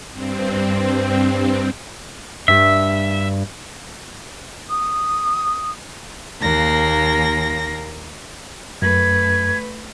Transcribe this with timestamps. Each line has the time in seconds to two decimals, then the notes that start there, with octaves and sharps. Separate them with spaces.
0.11 G2 C4
2.48 G2 E5
4.70 D#6
6.40 D#2 A#3 A#6
8.82 F#2 A3 B4 G#6